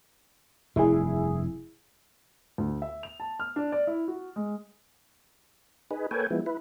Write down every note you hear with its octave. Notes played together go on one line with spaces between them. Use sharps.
F1 G2 E4 G#4
D2
E5
F7
A5
F6
D4
D5
E4
F#4
G#3
D#4 G#4 B4
A#3 A4 B4 C#5 G5 G#5
F3 G#3 B3 E4
E4 B4